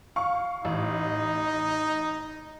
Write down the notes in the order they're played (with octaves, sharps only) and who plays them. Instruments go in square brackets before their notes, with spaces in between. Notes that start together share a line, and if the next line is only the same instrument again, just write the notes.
[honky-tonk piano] F5 C#6
[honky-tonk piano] A1 [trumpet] D#4